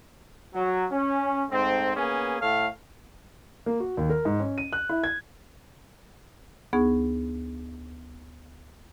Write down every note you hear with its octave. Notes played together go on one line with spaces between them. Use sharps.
F#3
C#4
G#2 A3 C4
A#3 B3 C#4 G#4
A2 A4 C#5 F5
A#3
F#4
D#2
A#4
G#2
C#4
D#7
F#6
E4
G#6
D2 B3 D#4 G#4 C#6